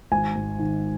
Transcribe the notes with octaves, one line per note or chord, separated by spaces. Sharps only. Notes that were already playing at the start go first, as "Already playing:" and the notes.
G#1 G#5
G#2
D#3